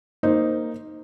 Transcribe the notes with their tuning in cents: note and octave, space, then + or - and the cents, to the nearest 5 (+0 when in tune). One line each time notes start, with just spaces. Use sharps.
A#3 -5 D#4 +0 C5 +0